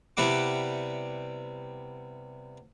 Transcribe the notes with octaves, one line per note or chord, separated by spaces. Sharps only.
C3 G3 B3 E4 F#5 D6